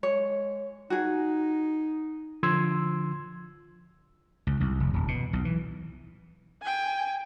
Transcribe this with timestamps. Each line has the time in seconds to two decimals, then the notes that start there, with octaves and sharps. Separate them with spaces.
0.03 G#3 C#5
0.90 D#4 F#4 G#4
2.43 D3 F3 C6 E6 G#6
4.47 C#2
4.61 C2
4.80 F1
4.94 D#1
5.08 B2
5.33 B1
5.45 E3
6.62 G5 G#5